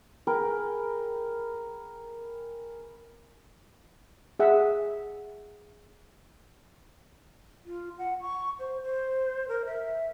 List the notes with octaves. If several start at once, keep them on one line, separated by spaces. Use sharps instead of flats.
G#4 A#4 B4 G5
G#4 E5 F#5
F4
F#5
C#6
C5
C5
A#4
E5